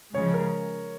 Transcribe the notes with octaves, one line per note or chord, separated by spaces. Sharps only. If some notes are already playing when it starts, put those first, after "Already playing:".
C#3 F3 G#3 C#5
A#4